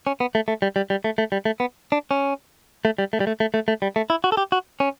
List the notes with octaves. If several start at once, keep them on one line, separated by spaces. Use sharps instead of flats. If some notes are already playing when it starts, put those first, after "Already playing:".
C#4
B3
A3
A3
G3
G3
G3
A3
A3
G3
A3
B3
D4
C#4
A3
G3
A3
G3
A3
A3
A3
A3
G3
A3
E4
F#4
A4
G4
F#4
C#4